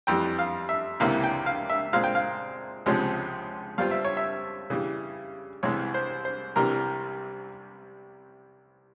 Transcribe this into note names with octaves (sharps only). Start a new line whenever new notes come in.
F2 E3 G3 G5
F5
E5
C#2 C3 E3 A#3 E4 F5
G5
F5
E5
A#2 G#3 C4 F5
G5
F5
C#2 C3 F3 G#3 C#4
G2 G3 C4 F4 F5
E5
C#5
E5
C#3 E3 G3
C2 C3 E3 G#3 C#5
C5
C5
C2 C3 E3 G3 A#4